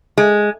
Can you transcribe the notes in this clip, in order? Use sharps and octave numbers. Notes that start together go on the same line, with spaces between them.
G#3